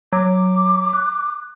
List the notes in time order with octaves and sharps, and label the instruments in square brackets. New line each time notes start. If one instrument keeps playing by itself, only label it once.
[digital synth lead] F#3 [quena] D6
[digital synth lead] F#6